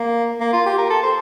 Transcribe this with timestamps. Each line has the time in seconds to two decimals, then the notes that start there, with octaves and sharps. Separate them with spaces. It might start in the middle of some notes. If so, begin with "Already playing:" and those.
Already playing: A#3
0.40 A#3
0.53 F4
0.66 G4
0.78 A#4
0.90 A4
1.03 C5